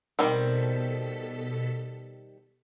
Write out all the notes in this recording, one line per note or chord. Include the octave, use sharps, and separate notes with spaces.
B2 D#3 G3 C4 A4 B6